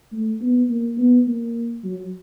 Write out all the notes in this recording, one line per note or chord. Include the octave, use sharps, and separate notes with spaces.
A3
B3
A#3
B3
A#3
F#3